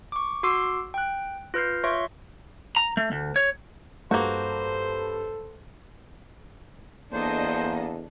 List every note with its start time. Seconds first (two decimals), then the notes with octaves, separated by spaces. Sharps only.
0.12 C#6 D6
0.43 F#4 C6 D6 E6 C7
0.94 G5 F#6
1.54 F4 B4 F6 G6 C7
1.84 F4 C#5 E5 C6 C#6
2.76 A#5
2.97 A3
3.12 D2
3.36 C#5
4.11 G2 A#3 F#4 A4 C5 G6
7.12 E2 A#3 D4 A4 C5 D#5